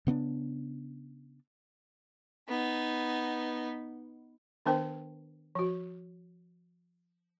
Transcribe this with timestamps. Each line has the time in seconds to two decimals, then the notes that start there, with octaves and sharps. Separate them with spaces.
0.07 C#3 B3 C4 D4
2.48 B3 D#4
4.66 D#3 B3 D4 A#4 C5 G5
5.55 F3 F#4